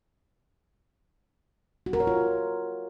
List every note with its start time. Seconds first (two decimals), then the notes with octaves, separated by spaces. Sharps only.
1.86 F#4
1.93 A#4
2.00 C#5
2.07 F4